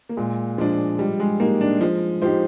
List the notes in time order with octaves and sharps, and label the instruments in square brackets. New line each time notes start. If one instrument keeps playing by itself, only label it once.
[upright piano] A#3
[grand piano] A#2 [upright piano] G#3
[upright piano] F3 [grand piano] G#3 D4
[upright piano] G3 [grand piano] G#3
[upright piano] G#3
[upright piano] A#3 [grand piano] D#4 G4
[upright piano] D4
[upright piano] F3 [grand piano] G#3
[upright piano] F3 [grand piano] D#4 G4 C5